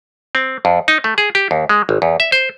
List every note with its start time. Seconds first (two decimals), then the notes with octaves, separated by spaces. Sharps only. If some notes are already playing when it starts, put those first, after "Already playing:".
0.35 C4
0.65 F2
0.88 D#4
1.04 A3
1.18 G#4
1.35 G4
1.51 D#2
1.69 G#3
1.89 G#1
2.02 E2
2.20 E5
2.32 C5